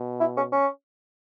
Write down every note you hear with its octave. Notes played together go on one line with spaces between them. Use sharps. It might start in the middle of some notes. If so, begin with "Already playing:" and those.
Already playing: B2
E4
C#4
C#4